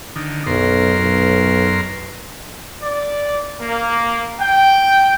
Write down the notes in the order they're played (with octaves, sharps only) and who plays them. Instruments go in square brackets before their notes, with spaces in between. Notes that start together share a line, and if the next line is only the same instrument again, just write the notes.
[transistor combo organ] D3 D#3
[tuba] B1 [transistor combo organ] F#2 A#4 C6
[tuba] B1
[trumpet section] D5
A#3
G5